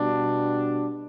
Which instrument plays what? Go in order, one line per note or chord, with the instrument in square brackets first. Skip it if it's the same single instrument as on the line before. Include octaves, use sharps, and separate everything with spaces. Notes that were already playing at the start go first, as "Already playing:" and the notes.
Already playing: [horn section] B2 G3 D4